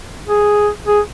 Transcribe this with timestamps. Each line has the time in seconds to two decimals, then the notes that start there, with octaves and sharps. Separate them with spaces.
0.27 G#4
0.86 G#4